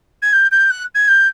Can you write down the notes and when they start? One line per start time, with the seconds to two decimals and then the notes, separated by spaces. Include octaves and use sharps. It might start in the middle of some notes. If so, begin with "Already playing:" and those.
0.22 G#6
0.33 G6
0.51 G6
0.70 F#6
0.94 G#6
1.08 G6